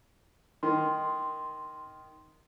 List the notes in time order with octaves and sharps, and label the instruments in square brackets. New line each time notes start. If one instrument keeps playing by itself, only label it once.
[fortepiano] D#3 [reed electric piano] C6